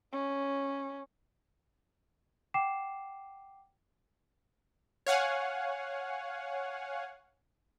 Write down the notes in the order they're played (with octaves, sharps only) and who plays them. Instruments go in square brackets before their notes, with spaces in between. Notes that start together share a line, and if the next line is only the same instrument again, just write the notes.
[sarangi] C#4
[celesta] F#5 G5 D6 C7 E7
[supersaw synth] C#5 F5 F#5 G#5